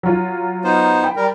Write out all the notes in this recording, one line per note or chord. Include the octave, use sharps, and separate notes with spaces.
F#3 F4
B3 D#4 C5
G5 B5
G3 A#4